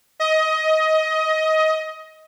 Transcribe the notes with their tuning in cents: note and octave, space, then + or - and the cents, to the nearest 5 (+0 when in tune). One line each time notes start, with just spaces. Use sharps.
D#5 +20